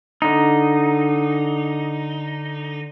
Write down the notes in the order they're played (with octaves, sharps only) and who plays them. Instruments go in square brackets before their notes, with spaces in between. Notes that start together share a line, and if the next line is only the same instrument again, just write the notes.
[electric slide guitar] D3 D#4